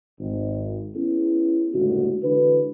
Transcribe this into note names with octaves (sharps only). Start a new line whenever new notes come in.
G#1
B3 C#4 E4 G#4
F#1 D#2 A2 D3 G#3 F#4
D3 E3 G#3 F#4 B4